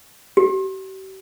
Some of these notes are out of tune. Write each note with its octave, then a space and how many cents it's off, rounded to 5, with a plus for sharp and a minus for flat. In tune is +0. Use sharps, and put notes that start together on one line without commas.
G4 -45